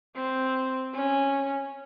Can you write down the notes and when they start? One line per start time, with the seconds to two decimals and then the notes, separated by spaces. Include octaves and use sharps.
0.16 C4
0.94 C#4